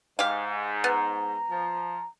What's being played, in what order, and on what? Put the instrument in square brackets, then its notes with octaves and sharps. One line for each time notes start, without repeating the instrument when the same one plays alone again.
[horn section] G#2 [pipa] G4 F5
[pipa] B3 [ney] A#5
[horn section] F3